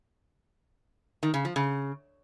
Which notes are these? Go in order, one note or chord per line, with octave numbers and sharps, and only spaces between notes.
D#3
C#3
F3
C#3